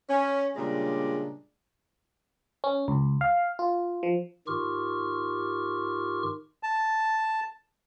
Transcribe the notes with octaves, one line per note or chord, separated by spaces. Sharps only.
C#4
A#2 C#3 G3 G#3 D4
C#4
C#2
F5
F4
F3
G#2 D#3 F4 G4 C#6 F6
A5